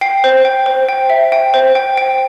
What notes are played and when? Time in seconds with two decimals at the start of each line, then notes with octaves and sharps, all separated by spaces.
0.01 G5 C7
0.24 C5
0.45 G5
0.66 C5
0.89 G5
1.10 E5
1.32 G5
1.54 C5
1.75 G5
1.97 G5